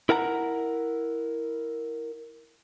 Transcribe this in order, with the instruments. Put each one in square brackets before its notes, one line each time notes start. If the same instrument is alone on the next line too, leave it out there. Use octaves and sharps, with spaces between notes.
[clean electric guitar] E4 A#4 F#5 A5 A#5